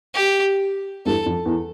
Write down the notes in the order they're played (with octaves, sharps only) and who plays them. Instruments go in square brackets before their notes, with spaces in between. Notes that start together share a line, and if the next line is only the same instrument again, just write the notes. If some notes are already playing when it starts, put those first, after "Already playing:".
[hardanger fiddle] G4
[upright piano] E2 G2 [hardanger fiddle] A4
[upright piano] F2
E2